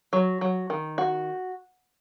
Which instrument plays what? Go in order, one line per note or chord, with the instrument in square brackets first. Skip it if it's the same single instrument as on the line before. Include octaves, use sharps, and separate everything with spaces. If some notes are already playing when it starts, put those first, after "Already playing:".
[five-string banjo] F#3
F#3
D#3
F#4